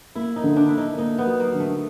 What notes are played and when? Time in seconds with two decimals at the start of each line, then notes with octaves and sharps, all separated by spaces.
0.15 A#3 E4
0.36 D#4
0.43 D3
0.56 D4
0.69 A#3 E4
0.78 D#4
0.98 A#3 D#4
1.19 B3
1.27 F#3
1.40 A#3
1.54 D3
1.60 A3